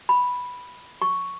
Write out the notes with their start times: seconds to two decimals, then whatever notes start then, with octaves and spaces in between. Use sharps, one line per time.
0.09 B5
1.02 C#6